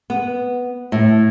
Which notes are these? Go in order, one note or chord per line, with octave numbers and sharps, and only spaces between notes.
B3
A2